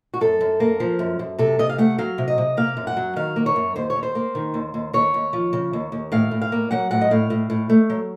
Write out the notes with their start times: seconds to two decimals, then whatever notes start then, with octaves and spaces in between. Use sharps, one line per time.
0.14 F#4
0.21 F#2 A4
0.41 F#2
0.60 A#3
0.80 F3
0.99 F#2
1.19 F#2
1.38 C3 A4
1.59 C3 D#5
1.69 F5
1.78 A3 F#5
1.98 F#3 F5
2.18 C3
2.28 D#5
2.38 C3
2.57 A#3 F5
2.77 F#2
2.87 F#5
2.97 F#3
3.16 D#3 F5
3.36 A#3
3.46 C#5
3.56 F#2
3.76 D#2 C5
3.90 C#5
3.96 D#2
4.03 C5
4.15 A#3
4.35 D#3
4.54 D#2
4.74 D#2
4.93 D#2 C#5
5.14 D#2
5.33 F3
5.53 C#3
5.73 D#2
5.92 D#2
6.12 A2 F5
6.31 A2
6.42 F5
6.52 A#3
6.71 F#3 F#5
6.91 A2 F#5
7.01 D#5
7.11 A2 F5
7.30 A2
7.50 A2
7.70 A3
7.90 F#3